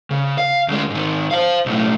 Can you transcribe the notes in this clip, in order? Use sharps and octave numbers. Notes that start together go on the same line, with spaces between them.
C#3
F5
D2 G#3
G#2 D#3
C5 F5
B1 A2